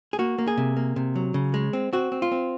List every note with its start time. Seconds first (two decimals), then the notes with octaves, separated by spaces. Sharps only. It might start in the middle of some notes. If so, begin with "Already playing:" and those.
0.13 G#4
0.19 A#3 F#4
0.38 A#3
0.48 G#4
0.58 C3
0.77 A#3
0.96 C3
1.16 F#3
1.34 C#3
1.54 G#3
1.73 C4
1.93 C4 F#4
2.12 C4
2.22 F4
2.32 C4